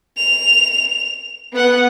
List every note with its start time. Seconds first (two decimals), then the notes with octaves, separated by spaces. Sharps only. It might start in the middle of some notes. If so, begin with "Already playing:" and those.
0.17 F7
1.53 B3 F#5